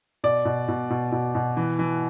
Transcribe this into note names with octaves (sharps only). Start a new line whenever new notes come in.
B2 D5
B2
B2
B2
B2
B2
E3
E3